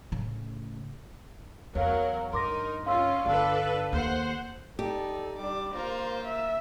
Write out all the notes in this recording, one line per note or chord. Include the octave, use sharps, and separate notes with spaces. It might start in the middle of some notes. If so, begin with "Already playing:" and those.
A2 C#3
E2 F#3 A#4 C#5 F5
G2 D#4 A#4 C6 D6 A#6
C#4 F4 F5 C6 E6
G1 D4 A4 B4 F5
D#2 C5 F#5
D#4 G4 A4 D5
G3 D4 D6
A#3 F4 A#4 C5
E5